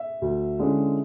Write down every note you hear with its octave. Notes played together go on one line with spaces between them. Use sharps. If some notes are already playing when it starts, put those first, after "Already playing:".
Already playing: E5
D2
D3 G#3 C#4 E4